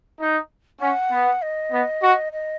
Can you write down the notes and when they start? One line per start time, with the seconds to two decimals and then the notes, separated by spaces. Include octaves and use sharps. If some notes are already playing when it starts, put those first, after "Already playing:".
0.19 D#4
0.80 C#4 F#5
1.11 B3
1.42 D#5
1.72 B3
2.02 F#4
2.32 D#5